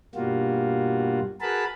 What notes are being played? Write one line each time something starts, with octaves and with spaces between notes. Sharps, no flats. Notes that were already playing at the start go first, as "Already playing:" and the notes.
G2 B2 G3 A#3 F4 F#4
F#4 G#4 A#4 B4 A5 B5